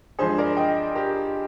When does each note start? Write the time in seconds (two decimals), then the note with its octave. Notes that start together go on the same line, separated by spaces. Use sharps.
0.19 G2 F3 G#3 G#4 C5
0.38 A#4 D5
0.57 D#5 G5
0.95 G4 A#4